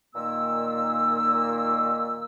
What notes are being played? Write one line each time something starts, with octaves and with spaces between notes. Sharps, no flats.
A#2 D#3 A#3 E6